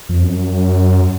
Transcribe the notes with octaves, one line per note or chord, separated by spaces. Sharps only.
F2
F#2